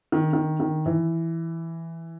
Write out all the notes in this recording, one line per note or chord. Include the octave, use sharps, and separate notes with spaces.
D#3
D#3
D#3
E3